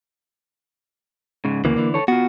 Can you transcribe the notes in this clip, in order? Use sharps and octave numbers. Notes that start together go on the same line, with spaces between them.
G#2 C#3
D2 C#3 E3 A#3
D3 E3
A4 C#5
B3 F4 F#4